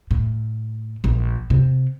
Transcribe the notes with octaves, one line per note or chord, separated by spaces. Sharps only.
A2
A#1
C3